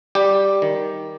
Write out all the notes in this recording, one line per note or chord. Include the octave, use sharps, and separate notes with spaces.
G3 G4
D#3